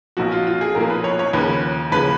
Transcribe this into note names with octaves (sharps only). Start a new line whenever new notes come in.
B1 A#2 F3 F#4
F4
F4
G#4
B1 A#2 F3 A#4
B4
C#5
C#5
D#2 C#3 F3 B4
D#2 C#3 F3 B4